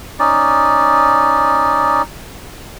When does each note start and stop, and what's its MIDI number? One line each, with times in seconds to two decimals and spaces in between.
0.20 2.02 61
0.20 2.02 63
0.20 2.02 74